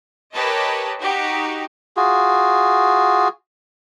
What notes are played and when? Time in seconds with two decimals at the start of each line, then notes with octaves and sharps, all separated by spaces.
0.33 G4 A#4 B4 C#5 D#5 A5
1.00 D#4 F#4 G4
1.97 F4 F#4 G#4